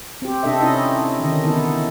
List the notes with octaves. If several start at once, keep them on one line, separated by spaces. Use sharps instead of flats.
C4 G4
C3 C4 D4 A4 D#5 E5
C#4 D#4 E4 G4 D#5
D3 D#3 C#4 D#5
E3 B3 D#4 E4 A4